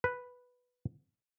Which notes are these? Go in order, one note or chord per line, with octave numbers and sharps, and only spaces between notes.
B4